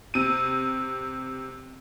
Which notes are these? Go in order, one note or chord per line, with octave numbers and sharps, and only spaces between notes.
C3 D#7